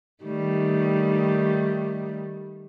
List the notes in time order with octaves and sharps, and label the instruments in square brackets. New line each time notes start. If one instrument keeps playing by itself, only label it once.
[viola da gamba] D#3 G3 A3